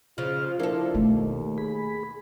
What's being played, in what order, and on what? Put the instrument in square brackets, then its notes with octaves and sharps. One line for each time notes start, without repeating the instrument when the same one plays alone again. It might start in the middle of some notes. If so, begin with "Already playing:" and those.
[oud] C#3 F3 [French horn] F4 [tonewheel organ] G#4 F6
[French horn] F3 [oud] A#3 A4 [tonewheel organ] D4 E4
[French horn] D#2 [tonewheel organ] B2 [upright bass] A3
[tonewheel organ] G#4 B5